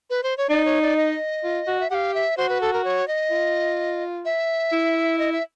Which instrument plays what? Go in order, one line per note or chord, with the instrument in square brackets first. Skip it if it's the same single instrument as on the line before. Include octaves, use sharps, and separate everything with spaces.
[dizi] B4
C5
C#5
[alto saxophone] D#4 [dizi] D5
[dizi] C#5
D5
D#5
[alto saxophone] F4
F#4
[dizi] E5
[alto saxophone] G4 [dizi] F5 F#5
[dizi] E5
[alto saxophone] F#4 [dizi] C5
[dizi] B4
A4
A#4
C#5
D#5
[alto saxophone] F4
[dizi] E5
[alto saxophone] E4
[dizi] D#5
E5